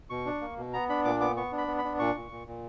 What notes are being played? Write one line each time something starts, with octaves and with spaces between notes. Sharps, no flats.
B2 C#6
D4
A#3
B2
B3 A#5
D4 B5
A#2 D6
B3 D6
B3 C#6
D4
B5
B3
B5
D4
A#2 C#6
A#2
A#2
A#2